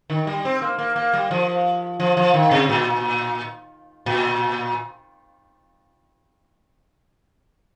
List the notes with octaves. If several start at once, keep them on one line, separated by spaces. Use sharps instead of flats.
D#3
G3
C4
A#3
A#3
A#3
G3
F3
F3
F3
D#3
C3
A#2
A#2